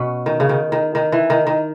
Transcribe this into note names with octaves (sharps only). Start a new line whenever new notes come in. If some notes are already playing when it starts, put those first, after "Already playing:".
Already playing: B2 B3 C#4
D#3
C#3
D#3
D#3
D#3
E3
D#3
D#3